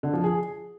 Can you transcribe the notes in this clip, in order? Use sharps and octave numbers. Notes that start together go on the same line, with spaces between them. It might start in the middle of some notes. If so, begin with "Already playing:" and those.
D3
F3
G#4